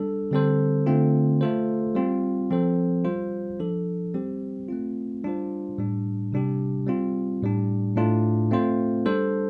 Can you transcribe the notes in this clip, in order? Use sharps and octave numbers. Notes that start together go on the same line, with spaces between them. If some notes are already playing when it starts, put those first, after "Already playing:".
Already playing: G3 D4 A4
D3 G3 C4 A4 C5
D3 A3 C4 F4
A3 F4 A4 C5
G3 C4 F4
F3 C4 A4 C5
G3 F4 C5
F3 D4 A4
G3 C4 G4 C5
A3 C4 F4
G3 D4 F4 C5
A2 G3 D4
C3 G3 D4 G4
G3 C4 F4
A2 G3 D4
A2 A3 D4 F4
A3 C4 F4 C5
G3 D4 A4 C5